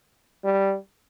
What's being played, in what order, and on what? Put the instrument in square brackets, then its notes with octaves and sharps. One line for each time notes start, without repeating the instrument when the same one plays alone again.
[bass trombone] G3